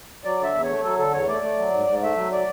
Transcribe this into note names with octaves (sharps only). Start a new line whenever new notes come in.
F#3 D5
D3 E5
E2
C#5
A3
F#3 A4
D3 A4
E2 C#5
A3 D5
A3
F#3
G#2
G#2
A3 E5
F#3
D5